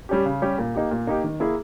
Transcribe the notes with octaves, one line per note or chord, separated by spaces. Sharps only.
G3 C#4 G4
C#3
G3 C#4 G4
A#2
A#3 D#4 G4
A#2
A#3 D#4 G4
D#3
A#3 E4 G#4